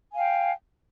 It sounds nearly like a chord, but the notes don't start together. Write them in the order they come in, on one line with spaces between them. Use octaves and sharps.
G#5 F5 G5